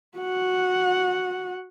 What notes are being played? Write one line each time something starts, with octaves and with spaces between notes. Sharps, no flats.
F#4 F#5